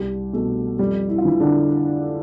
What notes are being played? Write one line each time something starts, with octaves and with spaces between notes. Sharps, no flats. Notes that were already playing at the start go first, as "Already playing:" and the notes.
Already playing: C2 G3 G4
B2 A3 A4
F2 G3 G4
E4
F4
E3 E4
D3 D4